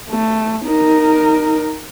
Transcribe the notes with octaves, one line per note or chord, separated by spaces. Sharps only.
A3
D#4 A#4